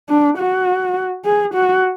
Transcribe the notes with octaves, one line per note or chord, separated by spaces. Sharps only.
D4
F#4
G#4
F#4